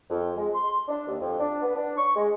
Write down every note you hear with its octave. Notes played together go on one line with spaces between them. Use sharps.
F2
G#3
C6
D4
D#2
F2
D4
B3
D4
C#6
G#3